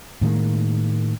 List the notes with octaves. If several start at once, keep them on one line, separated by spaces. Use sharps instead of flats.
A2 D#3 G#3 A#3